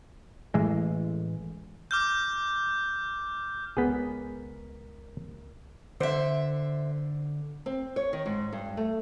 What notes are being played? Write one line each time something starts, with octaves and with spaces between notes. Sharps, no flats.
A1 A2 E3 G#3
D6 F6 G6
C#2 B3 G#4 A#4 B6
D3 C5 E5
C4
C#5
D#3
G#2
G2
A3